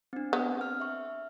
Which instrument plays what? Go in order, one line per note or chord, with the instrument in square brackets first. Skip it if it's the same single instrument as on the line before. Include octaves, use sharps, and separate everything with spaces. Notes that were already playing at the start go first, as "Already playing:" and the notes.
[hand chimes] C4 D4
[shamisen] B3
[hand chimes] F6
E5 C#6